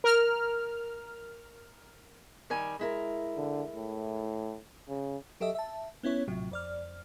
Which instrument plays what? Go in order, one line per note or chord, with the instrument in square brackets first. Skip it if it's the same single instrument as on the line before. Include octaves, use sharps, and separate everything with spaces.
[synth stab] A#4 F6
[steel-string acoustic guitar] D#3 G3 G#5
G#3 E4 A#4
[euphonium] D3
A2
C#3
[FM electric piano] F#3 G4 A4 D#5 E5
E5 A5
B3 C#4 E4 C#5
A#1 A2 C3 F#3
F2 D5 F6